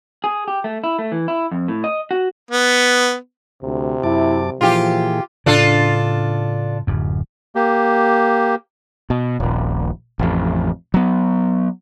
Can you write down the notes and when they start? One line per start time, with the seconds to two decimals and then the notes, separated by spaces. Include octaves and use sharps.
0.24 G#4
0.48 G4
0.64 A3
0.84 E4
0.99 A3
1.12 E3
1.28 E4
1.51 F2
1.68 A2
1.84 D#5
2.11 F#4
2.51 B3
3.63 D2 C3
4.03 F#2 E4 A5 D6
4.61 A#2 E3 F3 F4 G4 G#4
5.46 A2 C#3 D4 F4 A4
6.87 D1 F#2
7.55 A#3 G4
9.10 B2
9.40 D#1 A#1
10.19 A1 F2
10.94 F#3 B3